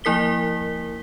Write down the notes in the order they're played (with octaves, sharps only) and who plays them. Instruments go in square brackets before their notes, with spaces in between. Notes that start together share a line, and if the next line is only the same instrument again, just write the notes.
[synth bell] F3 A#3 E4 A#4 B6 G7